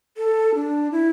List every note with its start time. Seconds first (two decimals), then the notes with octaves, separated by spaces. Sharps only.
0.17 A4
0.55 D4
0.92 E4